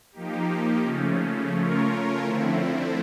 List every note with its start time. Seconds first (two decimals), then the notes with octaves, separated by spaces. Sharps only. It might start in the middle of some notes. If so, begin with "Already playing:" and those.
0.12 F3 A#3 D#4 G4
0.82 C#3 F3 A3 C#4
1.53 A3 C#4 F4 A#4 C#5
2.23 D3 F3 A3 C4 E4